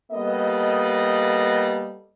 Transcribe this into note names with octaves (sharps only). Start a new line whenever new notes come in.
G3 A#3 B3 A4 D#5